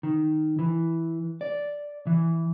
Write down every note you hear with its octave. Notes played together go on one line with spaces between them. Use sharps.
D#3
E3
D5
E3